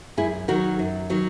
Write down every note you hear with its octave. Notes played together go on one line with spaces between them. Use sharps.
F#2 E4 G#4
D#3 F#3 F#4 A#4
F#2
D#3 F#3